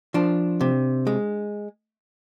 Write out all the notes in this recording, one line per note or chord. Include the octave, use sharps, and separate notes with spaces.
F3 D4
C3
G#3